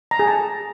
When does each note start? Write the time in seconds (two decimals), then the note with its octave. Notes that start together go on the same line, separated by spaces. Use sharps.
0.11 A#5
0.19 G#4
0.28 A5